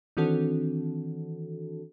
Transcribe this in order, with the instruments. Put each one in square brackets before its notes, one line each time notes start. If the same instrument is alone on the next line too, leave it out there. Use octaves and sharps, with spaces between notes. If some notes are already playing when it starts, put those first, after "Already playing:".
[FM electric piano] D#3 E3 C4 D4 F#4 A4